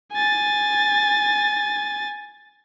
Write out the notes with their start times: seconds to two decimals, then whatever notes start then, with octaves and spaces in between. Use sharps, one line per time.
0.13 G#5 A6